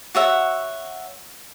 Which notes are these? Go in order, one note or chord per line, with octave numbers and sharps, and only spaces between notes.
F#4 C#5 E5 F#5